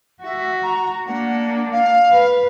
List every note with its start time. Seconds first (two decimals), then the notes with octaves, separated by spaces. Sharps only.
0.23 F#4 E5
0.62 A#5
1.06 A#3 D4 F#5
1.70 F5
2.12 B4